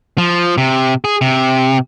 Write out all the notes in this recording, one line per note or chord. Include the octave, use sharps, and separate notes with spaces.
F3
C3
G#4
C3